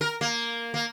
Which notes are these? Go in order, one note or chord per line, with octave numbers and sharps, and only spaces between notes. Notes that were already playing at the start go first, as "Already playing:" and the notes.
A#4
A#3
A#3